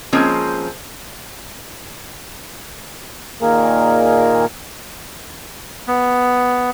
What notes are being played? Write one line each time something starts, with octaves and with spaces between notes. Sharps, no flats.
F3 G#3 A#3 C4 C#4
A#2 D#3 A#3 G#4 A#4
B3